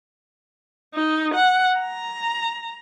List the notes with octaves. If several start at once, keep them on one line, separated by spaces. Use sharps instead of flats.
D#4
F#5
A#5